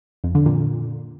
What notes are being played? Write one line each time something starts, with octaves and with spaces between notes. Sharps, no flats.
F2
D3
A#2